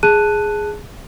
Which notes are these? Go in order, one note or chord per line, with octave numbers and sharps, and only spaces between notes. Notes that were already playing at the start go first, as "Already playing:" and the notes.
G#4 A5 F#6 D#7